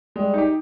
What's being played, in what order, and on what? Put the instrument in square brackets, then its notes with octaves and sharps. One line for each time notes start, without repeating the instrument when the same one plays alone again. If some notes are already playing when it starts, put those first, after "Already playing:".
[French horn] G3 [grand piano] G#3
[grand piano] D#4 G4